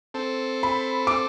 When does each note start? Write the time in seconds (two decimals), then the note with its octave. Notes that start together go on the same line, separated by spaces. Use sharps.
0.14 C4 A4
0.63 B5
1.07 D6